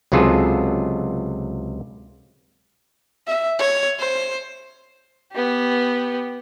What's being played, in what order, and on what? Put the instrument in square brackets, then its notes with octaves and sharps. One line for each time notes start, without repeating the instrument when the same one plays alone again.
[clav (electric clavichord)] C#2 C3 F#3 F4 G#4 A4
[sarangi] E5
C#5
C5
[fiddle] B3 G4